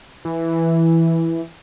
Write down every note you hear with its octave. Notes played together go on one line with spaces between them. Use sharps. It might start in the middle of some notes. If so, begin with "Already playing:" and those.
E3